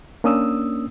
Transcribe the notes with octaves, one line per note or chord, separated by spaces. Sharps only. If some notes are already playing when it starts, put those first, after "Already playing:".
A#3 C#4 D4 D#6 E6